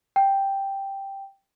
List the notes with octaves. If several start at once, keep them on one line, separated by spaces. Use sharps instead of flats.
G5